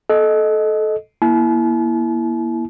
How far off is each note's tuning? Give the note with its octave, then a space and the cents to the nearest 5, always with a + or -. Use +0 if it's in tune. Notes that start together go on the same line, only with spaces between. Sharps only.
A4 -20 D#5 +0
A#3 +35 E4 +0 A5 -45